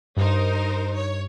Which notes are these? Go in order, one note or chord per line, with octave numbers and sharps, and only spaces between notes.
G2 D#4 A#4 C5
C#5